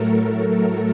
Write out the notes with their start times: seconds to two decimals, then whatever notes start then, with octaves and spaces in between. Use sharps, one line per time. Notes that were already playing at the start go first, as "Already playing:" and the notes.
Already playing: A2 F#3 A3 A4 A#4